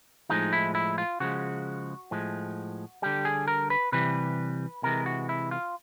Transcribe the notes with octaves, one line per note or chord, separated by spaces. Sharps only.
A2 F3 G#3 D#4
E4
E4
F4
C#3 F3 G#3 F#4
A2 F3 G#3
D3 G3 G4
G#4
A#4
B4
C3 E3 G3 B4
C3 E3 G#3 A#4
F#4
E4
F4